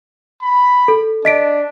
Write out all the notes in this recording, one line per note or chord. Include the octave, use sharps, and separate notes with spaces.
B5
A4
D4 D#5 B6 D7